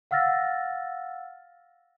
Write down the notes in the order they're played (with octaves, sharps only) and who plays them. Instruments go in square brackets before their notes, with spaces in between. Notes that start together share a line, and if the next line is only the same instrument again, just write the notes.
[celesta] F5 F#5 E6 F6 A6 A#6